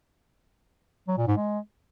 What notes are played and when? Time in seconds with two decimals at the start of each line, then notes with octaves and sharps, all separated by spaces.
1.08 F#3
1.18 A#2
1.27 G#2
1.37 G#3